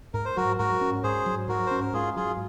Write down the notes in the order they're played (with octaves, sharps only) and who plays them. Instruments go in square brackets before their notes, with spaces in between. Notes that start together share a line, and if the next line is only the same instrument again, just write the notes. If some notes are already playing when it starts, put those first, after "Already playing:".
[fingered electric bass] G#2 [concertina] A#4
[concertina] C5
[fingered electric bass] F#3 [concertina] F#4 A#4
[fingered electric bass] G#2 [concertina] F#4 A#4
[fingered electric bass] C#4
[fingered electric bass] G#2 [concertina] G#4 C5
[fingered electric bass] F#3
[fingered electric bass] G#2 [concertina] F#4 A#4
[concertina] C5
[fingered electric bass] C#4
[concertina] A#4
[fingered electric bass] G#2 [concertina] F4 G#4
[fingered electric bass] F#3 [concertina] F4 G#4